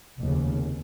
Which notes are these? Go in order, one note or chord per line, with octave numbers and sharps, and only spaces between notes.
F1 D#2 C#3